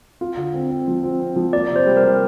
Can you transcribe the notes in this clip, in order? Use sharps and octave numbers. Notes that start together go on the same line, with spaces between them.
F4
D3
C4
C4
F3
C4
C4
F3
A#3 D5
C3
C5
G3
A#4
G3